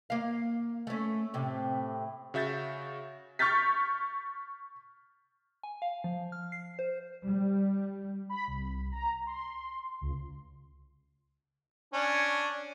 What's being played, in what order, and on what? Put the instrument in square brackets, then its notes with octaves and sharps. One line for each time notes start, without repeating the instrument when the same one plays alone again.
[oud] A#3 F5
A3 C#4
A2 C3
[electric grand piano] C#3 F#4 E5 G6 A6
[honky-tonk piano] C#6 F6 G6 A6 B6
[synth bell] G#5
F5
F3
F6
C7
C5
[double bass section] G3
[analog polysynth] B5
C2
A#5
C6
C#2
[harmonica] C#4 D4